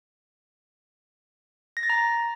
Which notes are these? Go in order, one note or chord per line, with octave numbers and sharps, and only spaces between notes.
A#6
A6
A#5